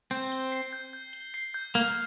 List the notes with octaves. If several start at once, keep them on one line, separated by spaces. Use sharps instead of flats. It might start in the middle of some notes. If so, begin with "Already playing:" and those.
C4 G6
G7
C7
G6
G6
G7
C7
G6
A#3 F6